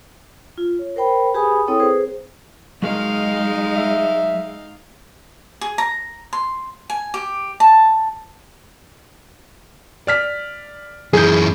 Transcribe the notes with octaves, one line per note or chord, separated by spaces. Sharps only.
F4
C#5
A#4 C5 G5 B5
G4 G#4 B4 G#5 B5 D#6
C4 E4 A4 C#5 G5 D#6
G#4 B4 C5
F#3 G#3 D#4 G#4 A#4 F5
E5
G#4
A#5
C6
G#5
G4
A5
D5 F6 B6
F#2 E3 G#4 G6